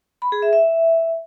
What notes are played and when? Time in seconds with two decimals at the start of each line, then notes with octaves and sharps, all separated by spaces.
0.22 B5
0.32 G#4
0.42 E5
0.53 E5